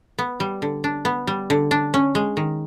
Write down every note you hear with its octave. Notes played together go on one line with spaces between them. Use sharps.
B3
G3
D3
D4
B3
G3
D3
D4
C#4
G#3
D#3